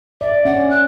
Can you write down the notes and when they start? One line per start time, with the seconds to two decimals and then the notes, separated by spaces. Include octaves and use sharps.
0.21 D5 E5
0.45 C#4 F#5
0.70 F#6